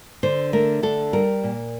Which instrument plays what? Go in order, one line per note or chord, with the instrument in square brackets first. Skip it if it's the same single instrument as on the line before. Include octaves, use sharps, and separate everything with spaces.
[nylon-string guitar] D3 C5
A3 A#4
D3 A4
G3 A#4
A#2